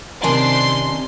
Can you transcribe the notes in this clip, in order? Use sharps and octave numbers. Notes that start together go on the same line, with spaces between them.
C3 D#3 C#4 D5 G#5 A5 C6